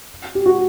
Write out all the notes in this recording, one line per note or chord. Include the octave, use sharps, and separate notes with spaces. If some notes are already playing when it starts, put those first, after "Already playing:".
G4
F#4